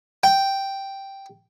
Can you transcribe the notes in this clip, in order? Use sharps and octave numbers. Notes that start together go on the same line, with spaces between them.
G5